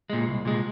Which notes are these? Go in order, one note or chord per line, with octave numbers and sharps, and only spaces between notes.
A#2 G#3
C2
A#2 G#3